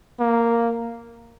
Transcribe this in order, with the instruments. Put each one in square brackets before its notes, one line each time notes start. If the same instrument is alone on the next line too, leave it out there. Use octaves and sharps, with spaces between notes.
[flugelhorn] A#3